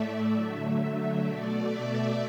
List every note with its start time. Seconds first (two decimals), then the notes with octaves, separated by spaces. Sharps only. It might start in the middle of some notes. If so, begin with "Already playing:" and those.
Already playing: A2 A3 D5 E5
0.33 D3 F#3 A3 E5
0.78 E5
1.24 B2 A3 D5
1.69 E5